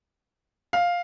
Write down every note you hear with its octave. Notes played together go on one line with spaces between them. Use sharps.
F5